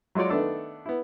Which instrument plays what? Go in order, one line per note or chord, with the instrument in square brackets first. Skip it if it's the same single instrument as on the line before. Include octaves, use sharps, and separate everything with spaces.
[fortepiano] F#3 G#3 F4 C#5 D5
D#3 A3 B3 D4 A4
B3 E4